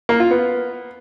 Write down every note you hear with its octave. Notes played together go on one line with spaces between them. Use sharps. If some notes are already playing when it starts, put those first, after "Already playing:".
A#3
F4
B3